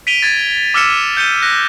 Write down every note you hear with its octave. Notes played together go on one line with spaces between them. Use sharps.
B6 D7 D#7 F7 G7
G#6 A6
D6 E6 F6 B6 C#7 E7
G6 C#7 D#7 G7
F#6 A#6